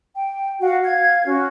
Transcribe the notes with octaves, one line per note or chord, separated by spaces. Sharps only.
G5
F#4 F5 F#5
F5 G#6
C#4 F#4